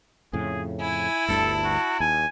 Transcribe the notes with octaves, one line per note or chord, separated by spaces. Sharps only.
F2 A2 C#3 G#4
E4 G#5
G1 D2 G2 A4 A5
F#4
D#2 G#5